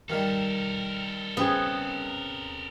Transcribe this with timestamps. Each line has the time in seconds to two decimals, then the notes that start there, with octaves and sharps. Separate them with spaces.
0.10 D#3 G3 A4 A#4 E5 F5
1.37 C#3 B3 C4 G#4